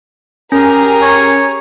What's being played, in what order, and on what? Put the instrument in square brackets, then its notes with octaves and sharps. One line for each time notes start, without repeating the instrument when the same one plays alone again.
[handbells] C#4 [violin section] G4 G#4 A#5 [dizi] A#4
[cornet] C#5